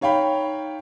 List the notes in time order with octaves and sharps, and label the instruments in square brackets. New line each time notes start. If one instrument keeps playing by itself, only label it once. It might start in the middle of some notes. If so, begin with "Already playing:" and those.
[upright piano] D#4 C#5 F5 G5 B5